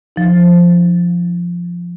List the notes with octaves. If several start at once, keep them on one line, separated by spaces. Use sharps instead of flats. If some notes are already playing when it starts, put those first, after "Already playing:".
F3 D#4